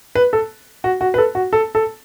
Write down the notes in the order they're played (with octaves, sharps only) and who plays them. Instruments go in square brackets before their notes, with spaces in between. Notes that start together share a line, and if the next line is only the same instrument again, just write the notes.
[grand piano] B4
A4
F#4
F#4
B4
A4
F#4
A4
A4